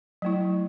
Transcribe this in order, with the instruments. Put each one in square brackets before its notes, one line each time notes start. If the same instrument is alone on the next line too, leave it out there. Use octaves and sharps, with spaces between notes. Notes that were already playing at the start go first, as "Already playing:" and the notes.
[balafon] F#3 A3 E4